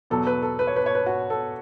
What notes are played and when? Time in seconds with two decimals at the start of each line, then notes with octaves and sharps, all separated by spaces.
0.10 E2 B2 F#3 A4
0.27 B4
0.42 A4
0.59 B4
0.67 C#5
0.76 B4
0.86 C#5
0.95 B4
1.06 F#4
1.30 A4